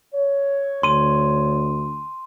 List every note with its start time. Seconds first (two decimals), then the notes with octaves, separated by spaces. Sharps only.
0.14 C#5
0.83 D2 C6 D#7